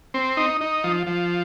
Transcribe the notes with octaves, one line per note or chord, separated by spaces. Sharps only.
C4
D#4
D#4
F3
F3